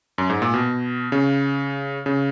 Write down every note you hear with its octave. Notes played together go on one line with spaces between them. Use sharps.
F#2
G#2
A#2
B2
C#3
C#3